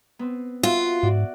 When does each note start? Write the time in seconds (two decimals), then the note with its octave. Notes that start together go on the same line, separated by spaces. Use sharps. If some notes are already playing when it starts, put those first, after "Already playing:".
0.19 B3 C4
0.63 F4 F#4 E5
1.03 G#2 F#4 D5